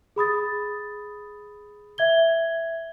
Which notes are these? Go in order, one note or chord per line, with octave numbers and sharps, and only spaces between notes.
G#4 B5 D#6 A6
E5 G#6 G7